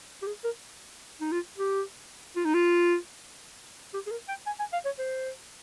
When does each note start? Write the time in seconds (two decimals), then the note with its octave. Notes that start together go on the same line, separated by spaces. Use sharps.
0.22 G4
0.27 G#4
0.44 A#4
1.21 D#4
1.31 F4
1.58 G4
2.36 F4
2.45 D#4
2.54 F4
3.94 G4
4.06 G#4
4.11 A#4
4.28 G5
4.47 G#5
4.59 G#5
4.73 F5
4.85 C#5
4.99 C5